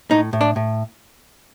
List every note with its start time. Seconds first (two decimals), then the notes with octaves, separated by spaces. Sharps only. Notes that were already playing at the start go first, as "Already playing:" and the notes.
0.11 A2 D#4
0.33 A2
0.41 D4
0.56 A2